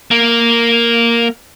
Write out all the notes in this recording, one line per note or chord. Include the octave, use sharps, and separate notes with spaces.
A#3